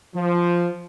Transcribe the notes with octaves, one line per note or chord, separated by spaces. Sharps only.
F3